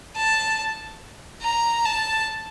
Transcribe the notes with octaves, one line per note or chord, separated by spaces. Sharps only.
A5
A#5
A5